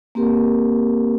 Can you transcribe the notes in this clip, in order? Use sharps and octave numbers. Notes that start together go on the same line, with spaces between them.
A#3 C4 G4 A#4